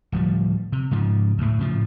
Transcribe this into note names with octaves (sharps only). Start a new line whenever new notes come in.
D1 F3 G3
C3
G#2 C#3 F3
D2 A2
A2 C#3 E3 F3